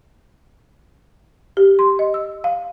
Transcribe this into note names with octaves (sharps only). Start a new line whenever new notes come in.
G4
C6
D#5
E6
F5